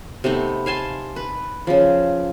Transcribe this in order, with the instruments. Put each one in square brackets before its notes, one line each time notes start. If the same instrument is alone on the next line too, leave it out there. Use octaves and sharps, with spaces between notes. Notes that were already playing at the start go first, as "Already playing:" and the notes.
[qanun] C3 A3 B3 D#4
F5 G#5 A5 C6
B4
C#3 F3